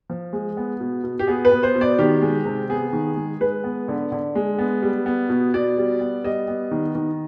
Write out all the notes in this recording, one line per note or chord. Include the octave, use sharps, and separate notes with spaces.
F3
G#3
B3
B2
B2
G4
B3 G#4
B4
B3
C5
B2
D5
D#3 G4
G#3
C3
B3 G#4
D#3
G#3
G#3 B4
B3
D3
D3
G#3
B3
G3
B3
B2
B2 D5
G3
B3
G3 D#5
B3
D#3
D#3